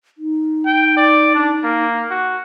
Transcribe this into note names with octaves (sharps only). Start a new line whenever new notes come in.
D#4
G5
D5
D4
A#3
F#4